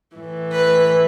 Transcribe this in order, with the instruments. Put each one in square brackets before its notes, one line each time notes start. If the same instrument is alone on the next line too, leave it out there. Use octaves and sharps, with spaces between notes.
[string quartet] A2 E3
B4